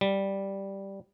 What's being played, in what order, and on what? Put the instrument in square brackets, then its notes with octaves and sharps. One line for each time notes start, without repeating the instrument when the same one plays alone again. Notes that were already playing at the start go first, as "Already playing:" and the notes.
[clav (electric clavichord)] G3